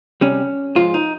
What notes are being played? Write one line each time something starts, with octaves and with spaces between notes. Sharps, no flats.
C3 G3 C#4
G#2 F3 G#3 F4
D#4